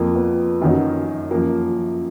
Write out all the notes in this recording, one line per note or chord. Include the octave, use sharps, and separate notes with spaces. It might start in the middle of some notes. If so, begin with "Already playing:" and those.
Already playing: F2 F3 A#3
B3
F#2 D#3 F#3
F#2 F3 A#3